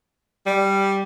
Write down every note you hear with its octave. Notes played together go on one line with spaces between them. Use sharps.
G3